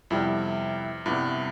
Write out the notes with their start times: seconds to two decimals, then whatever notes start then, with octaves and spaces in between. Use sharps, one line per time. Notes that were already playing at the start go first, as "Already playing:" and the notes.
0.11 F2 C3 G3 B3 E4
1.06 G2 C3 G3 B3 E4